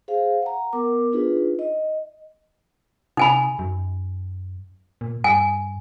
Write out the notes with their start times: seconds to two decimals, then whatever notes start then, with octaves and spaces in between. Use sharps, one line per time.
0.08 G#4 C5 F5
0.42 F#5 A#5
0.73 B3 A#4 D6
1.12 D4 D#4 F4 G#4 B4
1.59 D#5
3.17 C3 D#4 G#5 B5
3.59 F#2
5.01 A#2
5.24 G2 G#5